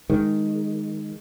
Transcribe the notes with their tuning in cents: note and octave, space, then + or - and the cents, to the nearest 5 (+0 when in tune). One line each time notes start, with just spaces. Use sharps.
D#3 +0 G#3 +0